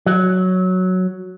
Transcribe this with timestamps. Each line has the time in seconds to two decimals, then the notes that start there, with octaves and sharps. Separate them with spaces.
0.06 F#3